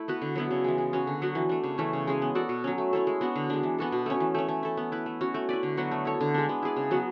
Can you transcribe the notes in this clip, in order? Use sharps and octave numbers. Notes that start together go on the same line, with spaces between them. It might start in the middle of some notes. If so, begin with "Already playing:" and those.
Already playing: A3 E4
B3 F#4 B4
D3
F#3 B3 E4
C#3
E3 G#3
G#3
C#4 F#4 B4
D3
F#3 B3 F#4
E3
A3 D4
C#3
E3 A3 C#4
C#3
G#3 C#4 G#4
B3
F#4 A4 D5
B2
F#3 C#4
A3
C#4 E4 A4
G#3
B3 D4 F#4
D3
G#3 D4
E3
B3 F#4 A4
B2
A3 C#4
E3
A3 C#4
A3
E4 A4
B3
E4 B4
A3
C#4 F#4
A3
E4 B4 D5
D3
F#3 B3 F#4
A3
E4 A4 C#5
D3
G#3 D4
B3
E4 G#4 D5
C#3
F#3 B3 F#4